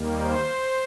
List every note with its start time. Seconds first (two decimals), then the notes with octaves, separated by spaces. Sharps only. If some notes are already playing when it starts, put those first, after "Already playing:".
Already playing: D#2 D#3 G3 A#3
0.21 C5